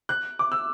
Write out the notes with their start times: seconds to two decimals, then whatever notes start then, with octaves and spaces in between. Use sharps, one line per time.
0.09 F#6
0.39 D6
0.52 E6